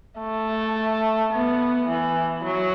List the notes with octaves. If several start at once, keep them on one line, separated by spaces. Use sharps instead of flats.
A3
B3
E3
F#3